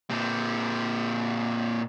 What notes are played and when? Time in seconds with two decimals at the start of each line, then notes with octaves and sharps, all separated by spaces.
0.10 A#2 C4